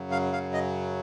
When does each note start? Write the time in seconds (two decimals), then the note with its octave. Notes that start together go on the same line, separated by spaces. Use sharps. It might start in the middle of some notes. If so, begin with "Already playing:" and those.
Already playing: F#2 C#3 F#3
0.11 F5
0.32 F5
0.53 D#5